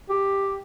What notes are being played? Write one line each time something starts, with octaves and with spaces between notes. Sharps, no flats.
G4